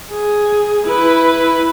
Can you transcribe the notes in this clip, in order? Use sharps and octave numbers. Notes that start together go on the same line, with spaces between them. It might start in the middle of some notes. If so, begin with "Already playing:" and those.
G#4
E4 B4